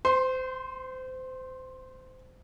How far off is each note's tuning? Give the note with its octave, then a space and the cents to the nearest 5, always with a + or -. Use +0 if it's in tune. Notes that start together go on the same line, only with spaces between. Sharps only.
C5 -25 C6 +15